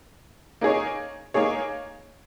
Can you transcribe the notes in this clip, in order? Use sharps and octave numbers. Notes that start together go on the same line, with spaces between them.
A#3 D#4 G#4 C#5
A#3 D#4 G#4 C#5